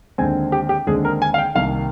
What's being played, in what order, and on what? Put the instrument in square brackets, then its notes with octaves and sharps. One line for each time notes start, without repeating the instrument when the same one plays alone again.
[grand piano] D#2 D3 G#3 C4 G#5
G4
G4
D#2 D3 G#3 C4 G#4
A#4
G#5
F5
G5
C2 C3 D#3 A#3 F5